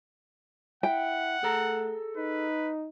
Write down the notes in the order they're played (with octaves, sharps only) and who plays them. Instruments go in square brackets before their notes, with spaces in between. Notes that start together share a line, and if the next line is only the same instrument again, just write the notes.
[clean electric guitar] E4 [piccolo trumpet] F#5 [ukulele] G5
[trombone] A3 [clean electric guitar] G#4 A4 A#5
[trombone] D#4 [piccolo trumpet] B4